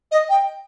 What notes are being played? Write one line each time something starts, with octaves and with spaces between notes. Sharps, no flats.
D#5
G5